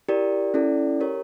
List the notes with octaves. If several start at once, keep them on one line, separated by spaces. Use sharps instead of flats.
E4 G4 A#4 D5
C#4 E4 A4 D5
G4 A#4 C#5